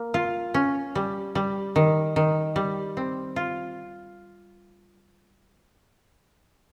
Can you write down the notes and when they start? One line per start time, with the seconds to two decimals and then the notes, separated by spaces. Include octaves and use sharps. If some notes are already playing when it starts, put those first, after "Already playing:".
Already playing: A#3
0.14 F4
0.54 C#4
0.95 G3
1.35 G3
1.76 D#3
2.16 D#3
2.56 G3
2.97 C4
3.36 F4